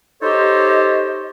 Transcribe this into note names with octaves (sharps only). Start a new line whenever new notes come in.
D#4 G4 A4 C5 C#5 D#5